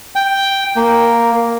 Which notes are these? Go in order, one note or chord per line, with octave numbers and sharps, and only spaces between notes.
G5
A#3